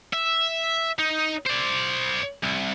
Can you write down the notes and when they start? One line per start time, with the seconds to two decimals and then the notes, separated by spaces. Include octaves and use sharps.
0.13 E5
0.99 D#4
1.47 C5 D5
2.43 C2